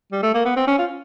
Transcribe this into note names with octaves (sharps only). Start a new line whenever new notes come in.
G3
A3
A#3
B3
C4
C#4
F4